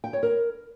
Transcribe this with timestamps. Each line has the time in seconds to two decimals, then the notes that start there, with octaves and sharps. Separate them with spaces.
0.04 G5
0.13 C#5
0.23 A#4